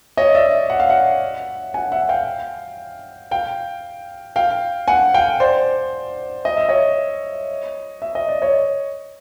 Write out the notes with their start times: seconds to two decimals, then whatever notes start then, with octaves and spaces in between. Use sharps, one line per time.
0.17 C#5 D#5
0.35 D5 E5
0.70 F#5
0.80 F5
0.89 E5 F#5
1.74 F#5 G#5
1.92 E5 F#5
2.09 F5 G5
3.31 F5 G5
4.36 F5 G5
4.88 F#5 G#5
5.14 F5 G5
5.40 C5 D5
6.45 D#5
6.57 E5
6.69 C#5 D#5
8.02 E5
8.15 D#5
8.29 D5
8.42 C#5 D#5